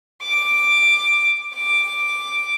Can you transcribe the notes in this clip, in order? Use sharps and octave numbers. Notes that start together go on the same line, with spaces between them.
D6
D6